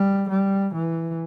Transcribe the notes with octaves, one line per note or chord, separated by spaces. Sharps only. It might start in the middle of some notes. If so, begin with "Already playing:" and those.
Already playing: G3
G3
E3